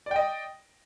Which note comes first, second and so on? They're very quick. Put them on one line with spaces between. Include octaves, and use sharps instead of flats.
D5 G5 D#5